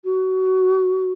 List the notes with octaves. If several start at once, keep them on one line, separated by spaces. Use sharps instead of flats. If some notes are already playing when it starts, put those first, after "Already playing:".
F#4